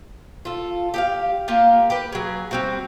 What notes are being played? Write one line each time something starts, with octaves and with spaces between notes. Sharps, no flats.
F4 A4
G4 G#4 F5
A#3 F4 G4
G4 B4
F#3 G#4
G3 C4 F#4